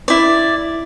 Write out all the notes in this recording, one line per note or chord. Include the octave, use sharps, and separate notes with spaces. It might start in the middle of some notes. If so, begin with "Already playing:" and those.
E4 D5